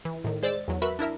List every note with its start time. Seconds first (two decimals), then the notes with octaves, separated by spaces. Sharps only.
0.05 E3
0.24 A2 D#3
0.43 G#3 C5 D5 E6 A6
0.68 E2 F#3
0.82 F#4 A#4 B4 E5 B5
0.99 D4 E4 A#4 E5